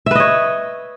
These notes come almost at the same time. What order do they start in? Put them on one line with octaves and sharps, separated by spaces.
E5 B4 D#5 C#5